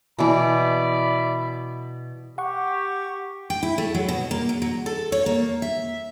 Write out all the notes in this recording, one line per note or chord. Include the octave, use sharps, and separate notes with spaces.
B2 E3 D5 E5 B5
G4 F#5 C#6
G5
E4
A3
F#3
B2
A#3
F#3
F#3
A4
C#5
A#3
E5